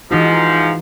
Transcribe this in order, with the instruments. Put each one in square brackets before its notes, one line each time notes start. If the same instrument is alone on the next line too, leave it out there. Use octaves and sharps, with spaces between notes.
[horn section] G#2 F3 [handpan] E3 D#4 F#4